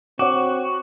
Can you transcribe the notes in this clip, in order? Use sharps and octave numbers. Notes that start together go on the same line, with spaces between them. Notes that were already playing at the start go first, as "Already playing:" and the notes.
C4 F#4 C#5 F#5 D6